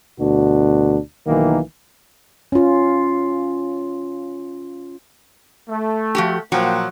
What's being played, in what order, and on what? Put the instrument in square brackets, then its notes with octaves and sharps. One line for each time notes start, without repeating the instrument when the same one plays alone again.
[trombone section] D2 B2 D4 F#4
B1 D#3 E3 A#3
[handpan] C#4 F4
[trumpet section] A3
[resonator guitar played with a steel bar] F3 F#4 G4
[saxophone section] A#2 F3 [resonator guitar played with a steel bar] F#3 F#4 [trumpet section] A#3 F#5 G5